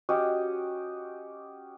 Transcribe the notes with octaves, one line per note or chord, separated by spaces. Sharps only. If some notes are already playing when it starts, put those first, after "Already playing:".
C#4 F#4 G4 D#5